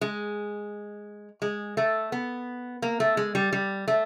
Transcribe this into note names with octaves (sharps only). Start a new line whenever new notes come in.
G#3
G#3
A3
B3
A#3
A3
G#3
G3
G3
A3